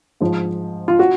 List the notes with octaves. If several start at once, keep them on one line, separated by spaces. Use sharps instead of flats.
G#2 F3
F4
F#4